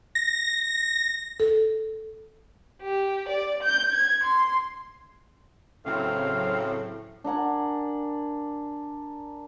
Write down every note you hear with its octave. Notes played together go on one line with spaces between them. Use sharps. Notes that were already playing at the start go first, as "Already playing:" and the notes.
A#6
A4
G4
D5
G6
G#6
C6
A2 C#3 F#3 C4 F5
D4 A#4 F#5 G#5